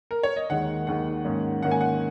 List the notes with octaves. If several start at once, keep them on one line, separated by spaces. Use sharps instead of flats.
A#4
C#5
D#5
D#2 D#3 G#3 F#5
D#2 D#3 G#3 F#5
G#2 D#3 A#3 C#4
G#2 D#3 A#3 C#4 F#5
G#5
F#5